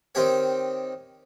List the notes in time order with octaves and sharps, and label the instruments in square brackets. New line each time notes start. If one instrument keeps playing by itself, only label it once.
[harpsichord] D#3 C4 G4 C#5